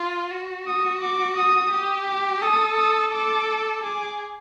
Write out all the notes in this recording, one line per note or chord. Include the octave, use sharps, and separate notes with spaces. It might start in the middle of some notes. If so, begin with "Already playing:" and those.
Already playing: F4
F#4
D#6
D6
D#6
G4
D6
A4 D#6
D#6
A4 D6
G#4 D6